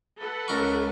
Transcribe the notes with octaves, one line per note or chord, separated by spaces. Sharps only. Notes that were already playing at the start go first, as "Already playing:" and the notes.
A4 B4 F#5
C#2 A#4 C#6